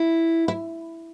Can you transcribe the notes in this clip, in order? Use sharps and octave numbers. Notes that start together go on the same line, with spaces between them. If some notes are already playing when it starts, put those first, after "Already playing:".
Already playing: E4
E4